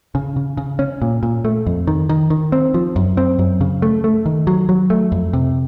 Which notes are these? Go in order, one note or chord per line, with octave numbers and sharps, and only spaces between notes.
C#3
C#3
C#3
C#4
A#2
A#2
A3
F2
D#3
D#3
D#3
C4
F3
F#2
C4
F#2
C#3
A3
A3
D#3
F#3
F#3
A3
F2
C3